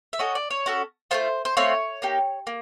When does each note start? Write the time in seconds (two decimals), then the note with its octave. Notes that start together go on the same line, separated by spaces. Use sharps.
0.13 E5
0.19 C#4 F#4 A4 D#5
0.35 D5
0.50 C#5
0.66 C#4 F#4 A4
1.11 A3 C4 F4 C5
1.45 C5
1.57 A3 C4 F4 C#5
2.02 A#3 D#4 G4
2.47 A#3